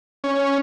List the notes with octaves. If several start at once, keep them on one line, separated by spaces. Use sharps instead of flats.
C#4